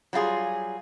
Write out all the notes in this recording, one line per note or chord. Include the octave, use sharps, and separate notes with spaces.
F#3 G3 F4 G#4